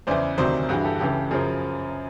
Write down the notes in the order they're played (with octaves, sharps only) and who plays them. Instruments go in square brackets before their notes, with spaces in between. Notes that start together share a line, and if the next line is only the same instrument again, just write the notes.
[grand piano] E2 C#3 E3 C5 D5
D2 C3 D#3 F#3 C5 D5
G2 E3 F#4 G#4
G4 A4
C#2 C#3 E3 G4 A4
F#2 C#3 F3 G#4 A#4